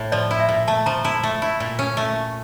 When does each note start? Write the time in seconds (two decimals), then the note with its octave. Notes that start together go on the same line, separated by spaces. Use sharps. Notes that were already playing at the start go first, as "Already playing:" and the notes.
Already playing: A2
0.12 F3 D5
0.31 E4
0.40 E5
0.49 A#2
0.68 A3 A5
0.86 F3 A#5
1.05 E4 A5
1.23 A3
1.42 E4
1.60 A#2
1.79 C#4
1.97 A3